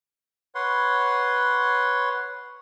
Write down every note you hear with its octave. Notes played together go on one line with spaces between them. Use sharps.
B4 C#5 F#5 C6